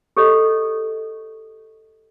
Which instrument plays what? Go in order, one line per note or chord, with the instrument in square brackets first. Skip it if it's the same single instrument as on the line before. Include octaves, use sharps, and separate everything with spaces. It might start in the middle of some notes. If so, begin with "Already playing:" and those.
[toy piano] G4 A4 C#5 D#5